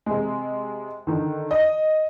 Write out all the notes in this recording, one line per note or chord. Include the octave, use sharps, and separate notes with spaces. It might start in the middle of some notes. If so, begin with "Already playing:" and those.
C3 G#3
D3 D#3
D#5